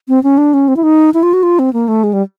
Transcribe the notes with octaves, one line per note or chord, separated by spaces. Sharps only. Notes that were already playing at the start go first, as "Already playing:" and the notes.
C4
C#4
D4
C#4
C4
E4
D#4
E4
F4
F#4
F4
C4
A#3
A3
G#3
G3